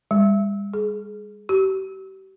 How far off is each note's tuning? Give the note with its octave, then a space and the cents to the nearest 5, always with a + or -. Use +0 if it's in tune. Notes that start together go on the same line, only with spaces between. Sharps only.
G3 +45
G#4 +20
G4 -40